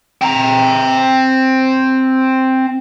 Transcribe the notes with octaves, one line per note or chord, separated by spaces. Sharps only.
C4 A#5